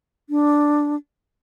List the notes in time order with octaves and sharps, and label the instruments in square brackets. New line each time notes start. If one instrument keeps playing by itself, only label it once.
[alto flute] D4